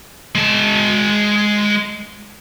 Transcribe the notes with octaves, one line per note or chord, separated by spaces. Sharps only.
G#3 A5